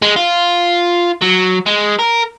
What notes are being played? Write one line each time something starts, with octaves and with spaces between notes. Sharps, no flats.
G#3
F4
F#3
G#3
A#4